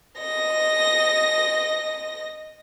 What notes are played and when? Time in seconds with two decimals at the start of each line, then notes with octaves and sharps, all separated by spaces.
0.19 D#5 A#6